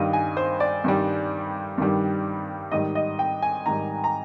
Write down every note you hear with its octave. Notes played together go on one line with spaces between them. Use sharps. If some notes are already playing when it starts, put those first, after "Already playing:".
Already playing: G2 D#3 G3 D#5 F5
G#5
C5
D5
G2 D#3 G3
G2 D#3 G3
G#2 D#3 G3 D#5
D#5
G5
G#5
G#2 D#3 G3 A#5
A#5